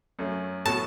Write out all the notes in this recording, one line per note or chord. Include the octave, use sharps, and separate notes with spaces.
F#2 F#3 A3
A2 F#3 B3 F#4 A4 A5